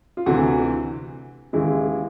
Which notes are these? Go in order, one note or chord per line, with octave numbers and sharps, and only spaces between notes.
F4
D2 C3 E3 F#4
D#2 C#3 E3 G#3 E4